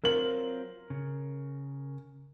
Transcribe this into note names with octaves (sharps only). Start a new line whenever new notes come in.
F#3 C4 F4 A#4 F#7
C#3